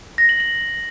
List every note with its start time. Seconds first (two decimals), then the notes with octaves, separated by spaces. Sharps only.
0.18 A#6
0.29 F#7
0.40 F#7